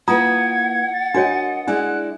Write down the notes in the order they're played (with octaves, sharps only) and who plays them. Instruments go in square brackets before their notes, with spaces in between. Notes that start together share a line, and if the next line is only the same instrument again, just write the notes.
[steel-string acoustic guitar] A#3 E4 B4 [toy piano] F4 A#5 D#6 [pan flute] F#5 [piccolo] G#6
[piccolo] A6
[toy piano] D4 F#4 C#5 [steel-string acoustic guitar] A#4 D#5
[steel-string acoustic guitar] G#3 E4 D5 [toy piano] D4 [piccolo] F#6